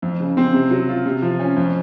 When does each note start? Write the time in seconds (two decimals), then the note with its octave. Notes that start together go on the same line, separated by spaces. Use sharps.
0.02 F2
0.20 C#3
0.37 C4
0.54 C3
0.71 F#3
0.88 F4
1.06 C3
1.22 F3
1.39 C#4
1.56 F2